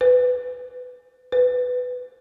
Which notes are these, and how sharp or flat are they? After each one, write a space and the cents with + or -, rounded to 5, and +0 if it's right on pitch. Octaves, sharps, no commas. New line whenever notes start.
B4 +20
B4 +15